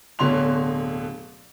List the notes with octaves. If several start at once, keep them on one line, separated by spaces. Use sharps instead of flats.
D1 B2 D3 C#5 C6 F7